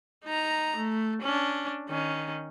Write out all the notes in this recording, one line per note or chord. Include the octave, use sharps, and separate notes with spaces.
D#4 A#5
A3
C#4 D4
D#3 C#4